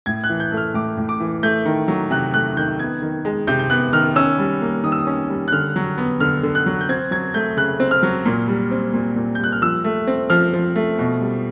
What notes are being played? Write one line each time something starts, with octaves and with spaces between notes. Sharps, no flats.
A2 G#6
F#6
E3
G6
A3
F6
A2 D6
A2
D6
E3
A3 G6
D#3
F#3
C3 F#6
A3 F#6
D#3 G6
B3 G#6
D#3
G#3
C3 G6
G6
B3 F#6
D#3 F6
C#4 E6
G3
A#3
D#3 D#6
E6
D#6
C#4
G3
F#6
D3 F6
F#3
B3
D3 F6
D3
F#6
F#3
G6
C4 G#6
F#3 G#6
A3 G6
C#3 F#6
C4
F6
F#3
A#2
G3
C4
A#2
A#2
G6
G3 F#6
F6
F3 E6
A3
C4
F3 F6
F3
A3
B2
G3